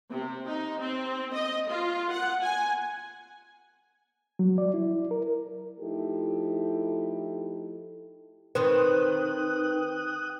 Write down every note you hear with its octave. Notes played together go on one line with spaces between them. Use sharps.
C3
D#4
C4
D#5
F4
F#5
G#5
F#3
D5
E4
A#4
F3 A3 D#4 E4 G4 A4
D#3 C4 B4 G5 D#6 F#6